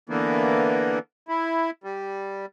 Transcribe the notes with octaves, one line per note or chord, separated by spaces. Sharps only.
D3 E3 A#3 B3
E4
G3